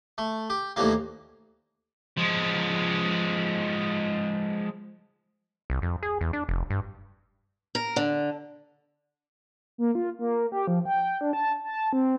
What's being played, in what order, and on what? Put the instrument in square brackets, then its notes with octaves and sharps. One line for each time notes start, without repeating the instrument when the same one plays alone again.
[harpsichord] A3
G4
D#2 A2 E3 F3 G3 A#3
[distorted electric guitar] F3 G#3
[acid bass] C2
F2
G#4
E2
D4
F1
G2
[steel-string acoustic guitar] A#4
D3
[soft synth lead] A#3
F4
A#3
G4
F3
G5
D4
A5
A5
C4